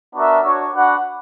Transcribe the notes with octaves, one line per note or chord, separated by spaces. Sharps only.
B3 D4 F#4 A#4 E5
D4 F#4 C#5
D4 F#4 B4 F#5